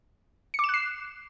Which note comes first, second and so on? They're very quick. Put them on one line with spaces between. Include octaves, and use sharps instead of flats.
C#7 D6 E7 F#6 C7